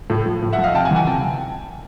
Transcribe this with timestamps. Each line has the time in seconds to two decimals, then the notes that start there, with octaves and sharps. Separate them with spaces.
0.10 A2
0.26 F3
0.42 A2
0.53 E5 F#5
0.58 F3
0.64 D#5 F5
0.74 C3 G5 A5
0.85 F#5 G#5
0.91 E3
0.96 F#5 G#5
1.07 C3 G5 A5